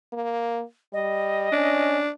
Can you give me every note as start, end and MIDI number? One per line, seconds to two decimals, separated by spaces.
0.13 0.62 58
0.93 1.52 55
0.93 1.97 75
1.52 2.01 61
1.52 2.09 62